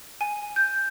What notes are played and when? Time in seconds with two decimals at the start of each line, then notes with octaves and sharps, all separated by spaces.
0.21 G#5
0.56 G6